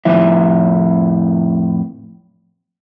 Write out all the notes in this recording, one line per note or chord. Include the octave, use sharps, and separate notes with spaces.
F2 A2 F3 E4 E5